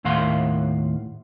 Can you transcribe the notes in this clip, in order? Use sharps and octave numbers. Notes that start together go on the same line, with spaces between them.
D#2 A2 F5 F#5 C6